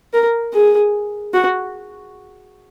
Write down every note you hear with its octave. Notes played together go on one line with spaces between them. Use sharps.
A#4
G#4
F#4